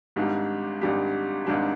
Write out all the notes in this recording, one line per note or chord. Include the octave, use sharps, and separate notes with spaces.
G#1 G#2 G3 D4 G4
G#1 G#2 G3 D4 G4
G#1 G#2 G3 D4 G4